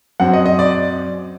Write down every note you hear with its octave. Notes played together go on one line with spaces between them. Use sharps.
F#2 F#3 C4 F#5
D#5
D#5
D5